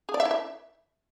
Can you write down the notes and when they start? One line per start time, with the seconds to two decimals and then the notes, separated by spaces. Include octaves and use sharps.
0.09 G#4
0.14 D5
0.20 E5
0.25 E4
0.31 E5